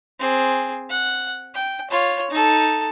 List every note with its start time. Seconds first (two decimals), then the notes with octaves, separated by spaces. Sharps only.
0.20 C4 G#4
0.90 F#5
1.54 G5
1.90 F4 C#5
2.31 D#4 A4